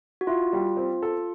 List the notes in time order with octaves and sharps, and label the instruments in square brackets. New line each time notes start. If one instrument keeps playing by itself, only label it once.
[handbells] F#4
[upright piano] E4 [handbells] F4
[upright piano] G3
C4
A4